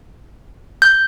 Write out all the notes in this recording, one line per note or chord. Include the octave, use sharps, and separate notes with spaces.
G6